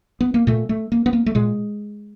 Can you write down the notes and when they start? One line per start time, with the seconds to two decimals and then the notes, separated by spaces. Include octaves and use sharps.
0.21 B3
0.34 A#3
0.47 A#2 A3
0.69 A3
0.92 A#3
1.06 B3
1.13 A#3
1.26 A3
1.35 A#2 G#3